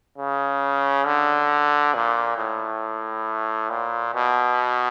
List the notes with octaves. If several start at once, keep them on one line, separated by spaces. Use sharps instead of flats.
C#3
D3
A#2
A2
A#2
B2